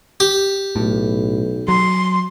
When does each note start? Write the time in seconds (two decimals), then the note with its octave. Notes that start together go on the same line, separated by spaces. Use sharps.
0.20 G4
0.76 B1 A2
1.68 F#3 C6